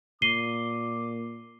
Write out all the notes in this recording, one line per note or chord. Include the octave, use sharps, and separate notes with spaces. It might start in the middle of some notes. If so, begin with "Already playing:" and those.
A#2 D6 C7 D#7 G7